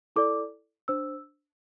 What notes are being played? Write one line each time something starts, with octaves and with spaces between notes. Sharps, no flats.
E4 A4 D5 D6
D4 C5 E6